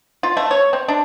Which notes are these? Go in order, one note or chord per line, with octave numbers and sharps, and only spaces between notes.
F4
A3
C#5
C4
D4